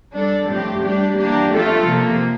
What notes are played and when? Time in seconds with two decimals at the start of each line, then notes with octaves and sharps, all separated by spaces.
0.14 G3 D4 A4
0.49 A2 F3 C4 G4
0.84 G3 D4 G4
1.18 E3 A#3 D4 G4
1.53 F3 A3 C4 F4 A4
1.87 C3 F3 A#3